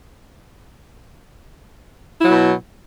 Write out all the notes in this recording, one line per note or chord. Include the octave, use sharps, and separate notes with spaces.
B2 F#3 E4